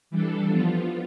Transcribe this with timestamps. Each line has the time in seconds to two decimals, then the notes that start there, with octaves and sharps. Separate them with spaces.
0.10 E3 G3 D4 A4
0.49 F3 B3 F4